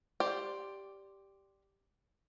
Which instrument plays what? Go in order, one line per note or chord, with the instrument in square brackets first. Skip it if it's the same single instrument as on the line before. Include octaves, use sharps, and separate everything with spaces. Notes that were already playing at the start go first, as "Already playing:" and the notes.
[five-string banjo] G4 C5 D5